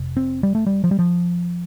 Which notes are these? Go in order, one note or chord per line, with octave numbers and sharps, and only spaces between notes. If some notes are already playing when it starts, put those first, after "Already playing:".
Already playing: F1 C3
C4
G3
A3
G3
F3
G3
F3